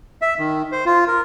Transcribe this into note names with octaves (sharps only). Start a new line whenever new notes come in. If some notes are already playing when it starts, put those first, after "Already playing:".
E5
D#3
C5
F4
A#4